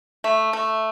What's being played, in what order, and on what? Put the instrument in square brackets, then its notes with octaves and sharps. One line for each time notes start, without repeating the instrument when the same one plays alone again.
[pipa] A3
A3